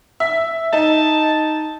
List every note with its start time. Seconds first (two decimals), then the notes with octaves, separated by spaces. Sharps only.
0.20 E5
0.73 D#4 A5